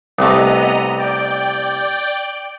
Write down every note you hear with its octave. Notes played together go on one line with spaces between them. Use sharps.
C2 A3 B3 D#5 A#5
D5 G5